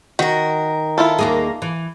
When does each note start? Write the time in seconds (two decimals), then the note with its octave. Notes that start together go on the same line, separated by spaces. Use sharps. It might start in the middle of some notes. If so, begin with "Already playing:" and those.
0.19 D#3 F#4 A#4
0.98 E4 F4 A4
1.19 D#2 A#3 G#4
1.62 E3